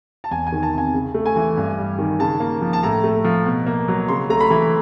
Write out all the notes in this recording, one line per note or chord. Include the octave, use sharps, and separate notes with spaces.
A5
E2 G#5
G#5
D#3
A5
C3 G#5
C#3
A3
G#5
E3
G2
G3
D#3
C#3 A5
A#3
F3
A5
A2 A#5
A3
F3
B2
A#3
F#3
C#3 C6
A3 A#5
B5
E3